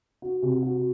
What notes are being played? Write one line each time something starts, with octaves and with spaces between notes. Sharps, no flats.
F#4
C3
F#4